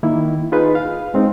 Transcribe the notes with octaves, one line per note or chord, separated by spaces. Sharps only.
D#3 A#3 E4
D#4 F4 G#4 B4
F5
G#3 C4 D#4